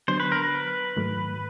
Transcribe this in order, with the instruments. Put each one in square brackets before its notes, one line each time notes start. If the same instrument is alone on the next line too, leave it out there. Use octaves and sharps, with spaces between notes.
[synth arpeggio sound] D3 F#3 B3 D4 [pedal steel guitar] C5
[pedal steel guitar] B4
A#4
B4
[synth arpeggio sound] G#2 D#3 F#3 A3